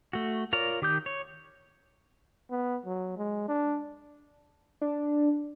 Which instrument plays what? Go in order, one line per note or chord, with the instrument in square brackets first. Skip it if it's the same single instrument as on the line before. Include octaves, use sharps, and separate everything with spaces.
[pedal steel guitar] A3 F#4
F4 A#4 C#5 D5 A#5
D#3 G4 D6 D#6 G6
C#5
[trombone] B3
F#3
G#3
D4
[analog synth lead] D4